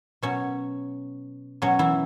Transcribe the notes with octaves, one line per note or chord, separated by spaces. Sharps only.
B2 F#3 C#4 C#5
B2 F#3 C#4 C#5
E3 E4